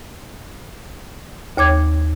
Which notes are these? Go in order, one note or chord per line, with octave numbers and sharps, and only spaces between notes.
D#2 C#5 D6 G#6